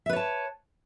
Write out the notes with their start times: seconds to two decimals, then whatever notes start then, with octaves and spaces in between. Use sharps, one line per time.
0.06 E5
0.09 B4
0.13 C#5
0.16 A5